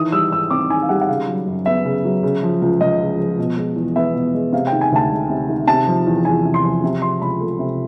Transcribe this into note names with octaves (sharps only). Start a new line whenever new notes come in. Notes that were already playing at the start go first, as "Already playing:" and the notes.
Already playing: D#3 E3 D#6
G3 E6
G#2 E6
C4 D6
D#3 G#5
F5
G3 F#5
F#5
C#3 F5
F#3
F#2
B3 E5
C#3
F#3
C#3
F3
C#2
C#2 D#5
C#3
F3
B2
G#3
E2
B3 E5
B2
G#3
C3 F5
G5
D#3
G#5
D2 A5
G#3
C3
D#3
C3 A5
F3
E2
E2 G#5
C3
C6
F3
C3
F3 C6
C#2 B5
A3
C3